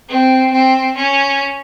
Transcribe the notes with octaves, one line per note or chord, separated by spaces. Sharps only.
C4
C4
C#4